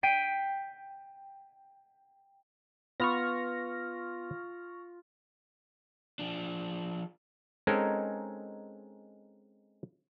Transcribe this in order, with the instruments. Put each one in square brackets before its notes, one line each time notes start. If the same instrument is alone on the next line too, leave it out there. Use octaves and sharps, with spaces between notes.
[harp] G5 B6 C7 D7 D#7
[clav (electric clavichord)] B3 [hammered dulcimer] F4 [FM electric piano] C#6 F6 A#6
[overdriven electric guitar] F3 D4
[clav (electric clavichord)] G#3 C4 C#4 D#4 A4 A#4